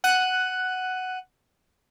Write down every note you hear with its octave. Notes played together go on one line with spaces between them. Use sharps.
F#5 F#6 D#7